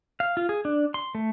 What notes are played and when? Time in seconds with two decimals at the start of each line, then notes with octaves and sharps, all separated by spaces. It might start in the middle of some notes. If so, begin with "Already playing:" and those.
0.20 F5
0.37 F4
0.49 G#4
0.65 D4
0.94 C6
1.15 A3